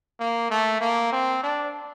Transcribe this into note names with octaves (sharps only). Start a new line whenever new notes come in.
A#3
A3
A#3
C4
D4